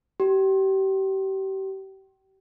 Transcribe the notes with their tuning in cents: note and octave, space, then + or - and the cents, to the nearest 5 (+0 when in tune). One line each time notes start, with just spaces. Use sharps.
G4 -35